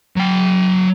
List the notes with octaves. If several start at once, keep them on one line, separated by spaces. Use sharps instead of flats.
F#3 G5